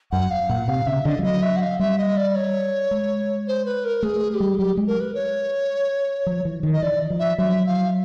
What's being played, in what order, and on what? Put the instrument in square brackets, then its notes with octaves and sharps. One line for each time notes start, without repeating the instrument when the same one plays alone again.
[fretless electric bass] F#2 [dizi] F#5
[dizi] F5
[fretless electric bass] A#2 [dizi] F#5
[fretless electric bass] C3 [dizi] F5
[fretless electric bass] C#3 [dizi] E5
[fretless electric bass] D3 [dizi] D#5
[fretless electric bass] F3
[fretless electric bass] F#3 [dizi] D#5
[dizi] E5
F#5
F5
[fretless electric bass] G3 [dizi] E5
[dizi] D#5
D5
C#5
[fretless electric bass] G#3
[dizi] C5
B4
A#4
[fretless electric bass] A3 [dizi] G#4
[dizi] G#4
G4
[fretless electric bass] G3
[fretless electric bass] F#3 [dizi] G4
[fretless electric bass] G#3
[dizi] A#4
B4
C#5
[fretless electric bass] F3
E3
D#3
[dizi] D#5
[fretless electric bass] E3 [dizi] D5
[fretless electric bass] F3
[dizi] E5
[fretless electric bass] F#3 [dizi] E5
[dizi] F5